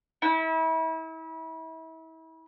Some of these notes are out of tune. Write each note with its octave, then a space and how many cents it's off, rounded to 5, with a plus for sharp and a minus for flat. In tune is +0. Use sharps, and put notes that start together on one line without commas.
E4 -35